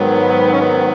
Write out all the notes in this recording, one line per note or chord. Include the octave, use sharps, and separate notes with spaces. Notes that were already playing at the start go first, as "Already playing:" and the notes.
Already playing: G#2 D#3 F#3 B3
C#4
B3